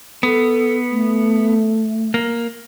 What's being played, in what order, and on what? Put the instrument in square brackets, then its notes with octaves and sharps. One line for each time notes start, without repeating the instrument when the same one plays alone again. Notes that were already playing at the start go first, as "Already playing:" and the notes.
[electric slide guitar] B3 [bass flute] A4
[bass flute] A3
[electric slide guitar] A#3